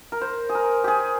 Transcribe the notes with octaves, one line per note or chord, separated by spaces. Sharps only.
A#4
C5
G#4
A#4
G4 G#4